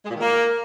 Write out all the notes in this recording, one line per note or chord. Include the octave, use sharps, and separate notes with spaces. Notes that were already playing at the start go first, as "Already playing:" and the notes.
G#3
A#2
D#3
A#3